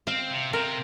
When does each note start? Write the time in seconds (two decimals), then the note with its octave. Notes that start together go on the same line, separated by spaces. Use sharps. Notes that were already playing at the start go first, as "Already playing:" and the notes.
0.07 C4 F5
0.30 C3
0.53 C3 A#4